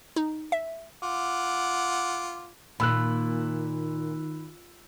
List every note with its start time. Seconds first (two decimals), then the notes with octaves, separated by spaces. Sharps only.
0.16 D#4
0.52 E5
1.03 F4 F#5 D6
2.80 A#2 D#3 B5 E6 F#6